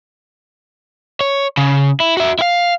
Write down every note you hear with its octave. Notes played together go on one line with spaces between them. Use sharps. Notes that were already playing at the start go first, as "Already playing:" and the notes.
C#5
C#3
E4
F#4 E5
E4 F5